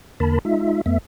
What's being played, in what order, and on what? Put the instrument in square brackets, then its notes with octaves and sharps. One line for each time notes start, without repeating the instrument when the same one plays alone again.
[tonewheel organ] E2 D3 A#3 A#4 A5 B5
G#3 D#4 F4 E5
F2 A3 B3 E5